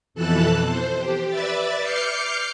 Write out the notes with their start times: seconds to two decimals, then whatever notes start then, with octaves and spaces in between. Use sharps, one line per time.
0.14 F2 B2 E3 A4 A5 F#6
0.64 C5
0.98 G4
1.28 B4 D5 E5 A6
1.81 D6 F6 G6 C7 C#7